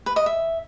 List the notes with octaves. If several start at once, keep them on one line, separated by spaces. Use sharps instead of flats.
B4
D#5
E5